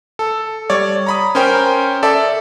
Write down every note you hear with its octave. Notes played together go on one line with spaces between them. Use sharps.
A4
G3 C#5 D5
A#5 B5 D#6
C#4 A#4 C5 G5
A4 D5 E5